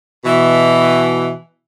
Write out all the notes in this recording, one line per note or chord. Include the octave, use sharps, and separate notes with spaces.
B2 E3